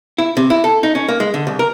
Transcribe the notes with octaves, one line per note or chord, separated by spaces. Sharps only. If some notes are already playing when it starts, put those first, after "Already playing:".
E4
C3
E4
A4
D#4
C#4
A#3
G#3
D3
C2
A#4